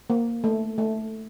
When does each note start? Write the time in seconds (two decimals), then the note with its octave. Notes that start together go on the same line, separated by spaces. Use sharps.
0.10 A#3
0.44 A3
0.78 A3